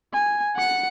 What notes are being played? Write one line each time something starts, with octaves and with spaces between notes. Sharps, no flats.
G#5
F#5 C#7